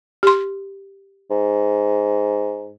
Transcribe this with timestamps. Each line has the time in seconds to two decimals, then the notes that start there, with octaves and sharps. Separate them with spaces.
0.23 G4 C6
1.31 G#2